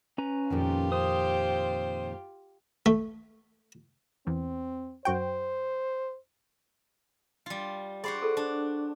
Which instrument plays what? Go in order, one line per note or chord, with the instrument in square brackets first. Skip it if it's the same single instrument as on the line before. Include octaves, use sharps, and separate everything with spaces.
[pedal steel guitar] C#4 B4 A#5
[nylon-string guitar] F2 A#2 D#3 [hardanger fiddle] F4 G4
[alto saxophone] C5 [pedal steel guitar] D#6
[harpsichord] A3
[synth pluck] E2 [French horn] C4
[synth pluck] F#2 F#4 G5 [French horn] C5
[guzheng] G3 F4
[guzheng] F#4 C5 D5 [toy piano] G#4 B5
[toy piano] F4 G#4 A4
[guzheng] D4